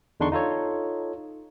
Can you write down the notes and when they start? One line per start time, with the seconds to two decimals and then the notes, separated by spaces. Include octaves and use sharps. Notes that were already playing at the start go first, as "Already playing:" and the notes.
0.20 E2 D3 D4 D#4 C6 C#6
0.32 D#4 F4 A4 C#5